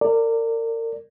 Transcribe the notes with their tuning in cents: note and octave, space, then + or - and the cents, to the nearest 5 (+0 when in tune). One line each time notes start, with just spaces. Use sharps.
A#4 -35 D5 +0